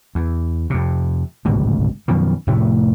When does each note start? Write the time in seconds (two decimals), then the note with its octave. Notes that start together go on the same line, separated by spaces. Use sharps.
0.15 E2
0.70 F2 C3
1.45 D1 G#1 C#2 B2
2.08 F#2 B2 D#3 F3
2.47 F1 A2 C3 A3